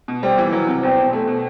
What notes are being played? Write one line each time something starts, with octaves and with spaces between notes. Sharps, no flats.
B2
G3 C4
E3
F#3
C3
E2 C4
B2
A3
B2